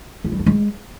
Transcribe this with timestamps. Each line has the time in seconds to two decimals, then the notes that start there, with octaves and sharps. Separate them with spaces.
0.24 F4
0.32 G3
0.39 E4
0.46 G#3